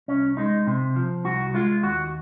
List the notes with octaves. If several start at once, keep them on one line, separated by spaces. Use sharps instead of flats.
C2 C#4
G#3 D#4
C3
F3
C2 F#4
G#3 F4
D#2 F#4